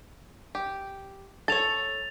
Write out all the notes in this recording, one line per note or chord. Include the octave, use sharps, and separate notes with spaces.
G4
A4 C#5 A6 F7